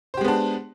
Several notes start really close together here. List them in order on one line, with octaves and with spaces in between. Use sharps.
C5 G4 G#3 B3 D4